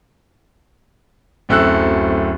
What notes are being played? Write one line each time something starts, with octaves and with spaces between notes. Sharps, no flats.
D1 F#2 A3 C4 E6 F#6